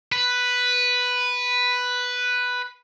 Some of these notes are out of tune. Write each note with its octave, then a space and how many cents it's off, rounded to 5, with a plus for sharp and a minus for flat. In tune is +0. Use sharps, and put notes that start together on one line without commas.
B4 +0